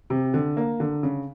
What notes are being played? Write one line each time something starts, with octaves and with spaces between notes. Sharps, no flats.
C3
D3
A#3
D3
C#3